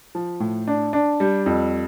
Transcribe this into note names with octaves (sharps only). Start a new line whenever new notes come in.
F3
A2
D4
D4
G3
F2